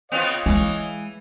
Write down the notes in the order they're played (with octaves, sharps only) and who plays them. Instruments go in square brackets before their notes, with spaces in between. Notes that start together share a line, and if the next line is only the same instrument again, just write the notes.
[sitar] B3 C4 F4 [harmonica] C#5 D#5 F5
[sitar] E3 [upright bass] G#3